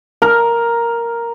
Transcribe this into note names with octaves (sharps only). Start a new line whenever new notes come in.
A#4